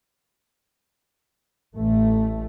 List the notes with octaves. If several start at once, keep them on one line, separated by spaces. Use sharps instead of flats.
A1 A3